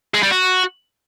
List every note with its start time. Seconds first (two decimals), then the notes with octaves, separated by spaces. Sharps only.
0.14 G#3
0.23 G3
0.32 F#4